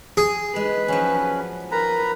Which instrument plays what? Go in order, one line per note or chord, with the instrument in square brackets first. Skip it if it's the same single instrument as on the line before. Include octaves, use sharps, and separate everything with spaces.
[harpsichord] G#4
[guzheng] G#3 [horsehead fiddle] B4
[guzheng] F3 F#3 [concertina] C#4
[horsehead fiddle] A#4 [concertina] B4 A#5 B5